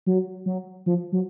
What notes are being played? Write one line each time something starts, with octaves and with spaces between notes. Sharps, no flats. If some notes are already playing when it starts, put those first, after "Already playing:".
F#3
F#3
F3
F#3